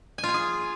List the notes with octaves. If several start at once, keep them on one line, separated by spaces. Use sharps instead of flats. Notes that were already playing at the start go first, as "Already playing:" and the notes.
G#5
F4
G#5
G#4